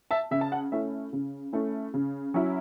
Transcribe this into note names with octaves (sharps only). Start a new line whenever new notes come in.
E5 A5
C#3 E5
A5
F#5
A3 C#4 E4 E5
C#3
A3 C#4 E4
C#3
F#3 C#4 E4